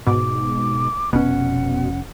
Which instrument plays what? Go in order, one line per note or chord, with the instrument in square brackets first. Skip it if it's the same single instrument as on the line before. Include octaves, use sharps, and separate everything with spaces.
[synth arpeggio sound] G#2 B2 [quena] D6
[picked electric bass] F1 C#4 [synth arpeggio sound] B2 [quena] F#5